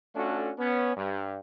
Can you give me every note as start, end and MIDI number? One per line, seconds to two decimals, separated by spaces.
0.15 0.52 57
0.15 0.52 61
0.15 0.52 62
0.15 0.52 65
0.15 0.52 66
0.15 0.52 69
0.59 0.96 59
0.59 0.96 61
0.97 1.39 43